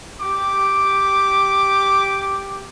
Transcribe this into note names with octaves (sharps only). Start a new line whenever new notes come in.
G4 D6